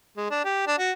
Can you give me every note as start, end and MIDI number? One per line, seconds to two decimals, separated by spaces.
0.17 0.26 56
0.30 0.42 62
0.45 0.64 67
0.67 0.75 62
0.78 0.92 66